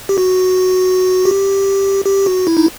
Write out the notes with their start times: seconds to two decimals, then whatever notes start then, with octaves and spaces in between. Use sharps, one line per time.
0.09 G4
0.18 F#4
1.25 G4
2.06 G4
2.26 F#4
2.47 E4
2.57 D#4